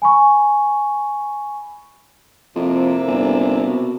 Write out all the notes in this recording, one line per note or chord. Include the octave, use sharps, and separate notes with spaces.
G#5 B5 C#6
F2 C3 A#3 E4
G1
B2